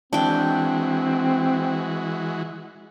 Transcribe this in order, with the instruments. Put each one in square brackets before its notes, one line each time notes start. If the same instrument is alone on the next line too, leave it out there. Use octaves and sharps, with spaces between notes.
[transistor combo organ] E3 G#3 F#4 [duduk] C4 [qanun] D4 G5